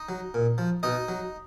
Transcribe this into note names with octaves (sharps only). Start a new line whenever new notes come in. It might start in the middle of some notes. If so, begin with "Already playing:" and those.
Already playing: D#4 D#5
F#3
A#2
F3
B2 D#4 D#5
F#3